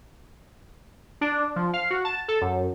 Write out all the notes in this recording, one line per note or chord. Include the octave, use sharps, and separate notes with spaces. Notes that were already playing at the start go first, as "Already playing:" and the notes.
D4
F3
F5
F#4
A5
A4
F#2